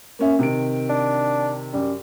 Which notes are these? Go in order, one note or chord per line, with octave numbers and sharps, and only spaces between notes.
A#3 C#4 E5
C3 D#3 D7
D4
F#2 G3